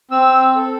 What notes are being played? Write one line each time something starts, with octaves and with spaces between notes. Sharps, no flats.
C4 E6
A4